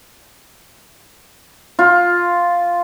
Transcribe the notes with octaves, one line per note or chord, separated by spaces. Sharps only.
F4